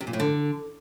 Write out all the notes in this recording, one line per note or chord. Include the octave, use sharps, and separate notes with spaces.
C3
A#2
A2
D3